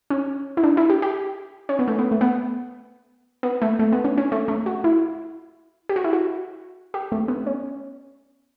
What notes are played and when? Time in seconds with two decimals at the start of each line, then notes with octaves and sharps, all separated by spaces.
0.10 C#4
0.57 E4
0.64 D4
0.77 E4
0.89 G4
1.02 G4
1.69 C#4
1.79 B3
1.88 A3
1.99 B3
2.11 A3
2.21 B3
3.43 B3
3.62 A3
3.79 A3
3.92 B3
4.04 C#4
4.18 C#4
4.32 A3
4.48 A3
4.66 F#4
4.84 E4
5.89 G4
5.96 F#4
6.04 E4
6.13 F#4
6.94 G4
7.12 A3
7.28 B3
7.46 C#4